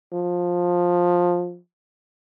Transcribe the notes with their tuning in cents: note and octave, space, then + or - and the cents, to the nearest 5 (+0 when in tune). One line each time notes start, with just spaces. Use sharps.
F3 +15